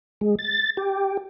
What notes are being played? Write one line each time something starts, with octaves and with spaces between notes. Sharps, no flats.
G#3
A6
G4